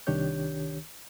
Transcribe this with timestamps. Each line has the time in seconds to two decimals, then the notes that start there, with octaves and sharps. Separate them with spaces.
0.07 C2 D#3 D4 G4 C#5 G6